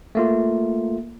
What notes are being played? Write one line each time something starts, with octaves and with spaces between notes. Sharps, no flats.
A3 A#3 F4